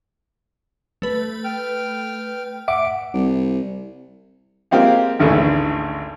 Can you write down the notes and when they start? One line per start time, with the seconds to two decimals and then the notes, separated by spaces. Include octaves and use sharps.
1.02 A3 B4
1.44 G5 F6
2.68 E5 F#5 D6 D7
3.14 C2
4.71 G#3 A#3 C4 F4 G4
5.20 G#1 D2 G#2 C#3 E3